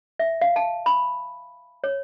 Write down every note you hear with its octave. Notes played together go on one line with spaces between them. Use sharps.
E5
F5
A5
B5
C#5